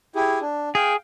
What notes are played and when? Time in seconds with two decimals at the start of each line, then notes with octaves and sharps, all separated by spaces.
0.16 E4 G4 G#4
0.41 D4
0.75 G#4 F5 G5